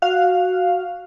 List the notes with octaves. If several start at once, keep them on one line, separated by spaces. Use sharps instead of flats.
F#4 F5